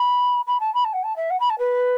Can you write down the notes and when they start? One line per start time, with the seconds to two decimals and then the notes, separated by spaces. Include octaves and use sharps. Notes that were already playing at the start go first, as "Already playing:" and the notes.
Already playing: B5
0.47 B5
0.60 A5
0.74 B5
0.84 A5
0.93 F#5
1.03 A5
1.16 E5
1.30 F#5
1.40 B5
1.50 A5
1.59 B4